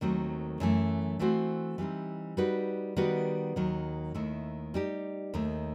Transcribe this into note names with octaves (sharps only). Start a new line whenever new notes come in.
D#2 D#3 F#3 A3 C4
F#2 E3 A3
E3 A3 C4 F#4 C5
E3 G3 C4 D#4
G3 D#4 F#4 B4
D#3 G3 B3 F#4 B4
D#2 D#3 F#3
D#2 D#3 A3 E4
G3 D#4 G4
D#2 D#3 A3